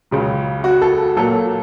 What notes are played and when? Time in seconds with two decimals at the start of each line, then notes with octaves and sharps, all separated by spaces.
0.11 C#2 C#3 F#3
0.64 F#4
0.82 A4
1.16 A#2 F#3 A#3 A4